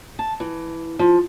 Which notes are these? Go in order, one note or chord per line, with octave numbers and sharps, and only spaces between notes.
A5
E3
F3